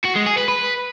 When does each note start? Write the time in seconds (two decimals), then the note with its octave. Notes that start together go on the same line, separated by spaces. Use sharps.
0.04 F#4
0.15 G#3
0.26 G#4
0.37 B4
0.48 B4